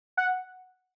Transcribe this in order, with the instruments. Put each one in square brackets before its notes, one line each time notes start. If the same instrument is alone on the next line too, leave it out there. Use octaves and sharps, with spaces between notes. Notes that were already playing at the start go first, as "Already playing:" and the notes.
[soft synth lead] F#5